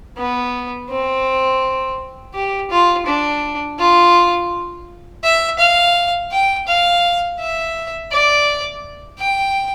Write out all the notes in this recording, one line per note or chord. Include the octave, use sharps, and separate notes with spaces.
B3
C4
G4
F4
D4
F4
E5
F5
G5
F5
E5
D5
G5